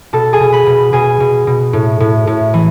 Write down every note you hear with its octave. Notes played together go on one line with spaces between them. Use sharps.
B2 A4 A5
G#4 G#5
B2
B4 B5
B2
B2 G#4 G#5
B2
B2
A2
A2
A2
E3